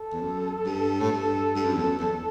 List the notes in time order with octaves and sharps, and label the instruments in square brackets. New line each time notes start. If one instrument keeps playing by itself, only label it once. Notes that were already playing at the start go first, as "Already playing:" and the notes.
Already playing: [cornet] A4
[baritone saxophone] E2
F#2
G2
A2
G2
G2
F#2
E2
F#2
E2